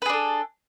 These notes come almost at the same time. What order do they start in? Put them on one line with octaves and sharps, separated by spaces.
B4 G#4 D4 A4